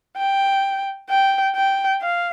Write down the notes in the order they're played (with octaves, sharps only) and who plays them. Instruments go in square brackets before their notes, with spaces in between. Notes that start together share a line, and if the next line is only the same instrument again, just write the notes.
[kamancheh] G5
G5
G5
F5